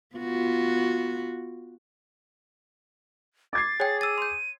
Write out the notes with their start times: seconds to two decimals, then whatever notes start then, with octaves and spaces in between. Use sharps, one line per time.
0.16 B3 F4 F#4
3.53 D6 G#6 A6 C7
3.80 G#4 C#5 G5
4.01 E6 A6 D#7
4.18 C6 G6